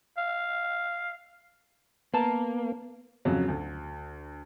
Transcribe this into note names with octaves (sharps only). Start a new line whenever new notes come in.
F5
A#3 B3 B4 A5 A#5
F2 C#3 F#3
D2